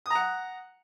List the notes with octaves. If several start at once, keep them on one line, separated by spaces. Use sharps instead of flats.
F#5 A#5 D#6